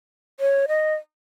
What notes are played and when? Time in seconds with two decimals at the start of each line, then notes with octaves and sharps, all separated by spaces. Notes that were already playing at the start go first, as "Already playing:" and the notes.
0.40 C#5
0.68 D#5